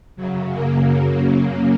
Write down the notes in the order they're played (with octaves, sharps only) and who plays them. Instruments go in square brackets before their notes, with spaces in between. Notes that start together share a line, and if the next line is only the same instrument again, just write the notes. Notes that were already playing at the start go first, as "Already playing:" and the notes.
[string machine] F#2 C#3 F#3
A#3